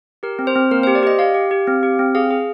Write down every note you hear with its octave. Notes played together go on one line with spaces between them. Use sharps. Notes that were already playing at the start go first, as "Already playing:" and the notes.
G4 A#4
C4
C5
C4
A#3 A#4
G4 C5
D5
G4 D#5
G4 F5
G4
G4
C4
G4
C4
G#4 F5
G#4